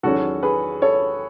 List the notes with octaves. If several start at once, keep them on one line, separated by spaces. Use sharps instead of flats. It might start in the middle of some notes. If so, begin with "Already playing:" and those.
E2 D#3 F#3 C#4 F#4 A4
G#4 B4
A4 C#5